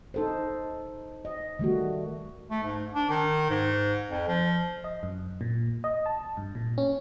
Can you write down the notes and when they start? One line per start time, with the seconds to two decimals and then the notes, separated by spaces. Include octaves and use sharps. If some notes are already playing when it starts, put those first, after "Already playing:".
0.14 D#4 A4 C5
1.25 D#5
1.59 D#3 G3 A3 F#4
2.51 A3
2.63 G#2
2.94 D4
3.09 D#3
3.50 G#2
4.10 F2
4.28 F3
4.84 D#5
5.03 F#2
5.41 A#2
5.84 D#5
6.06 A5
6.37 G2
6.55 A#2
6.78 C#4